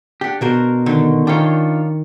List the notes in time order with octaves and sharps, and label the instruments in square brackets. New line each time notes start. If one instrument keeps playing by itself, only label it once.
[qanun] D4 F#5 [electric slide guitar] G4
[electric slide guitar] B2 [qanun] F#4 A#4 C5
[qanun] D3 D#3
[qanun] D#3 G5 [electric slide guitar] D4 F4 C#5